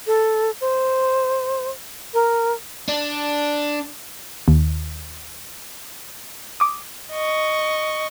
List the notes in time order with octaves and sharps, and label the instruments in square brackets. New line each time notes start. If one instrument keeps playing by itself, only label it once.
[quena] A4
C5
A#4
[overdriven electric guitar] D4
[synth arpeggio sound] D#2
D6 D#6
[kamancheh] D#5 C#6